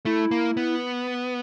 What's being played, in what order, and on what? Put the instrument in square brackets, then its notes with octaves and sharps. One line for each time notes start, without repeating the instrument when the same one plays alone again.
[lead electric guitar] A3 [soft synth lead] E4
[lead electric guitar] A#3
B3